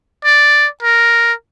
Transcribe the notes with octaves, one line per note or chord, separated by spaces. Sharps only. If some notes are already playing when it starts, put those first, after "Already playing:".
D5
A#4